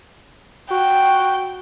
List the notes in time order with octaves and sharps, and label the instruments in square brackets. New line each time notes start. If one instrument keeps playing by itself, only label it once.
[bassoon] F#4 [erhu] G5